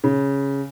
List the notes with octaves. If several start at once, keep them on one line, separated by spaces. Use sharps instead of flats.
C#3